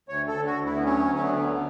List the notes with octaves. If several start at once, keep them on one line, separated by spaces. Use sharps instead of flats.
D2 C#5
A4
D2
F#4
D2
E4
B3
F#3 C#4
D2
C#4
B3
D3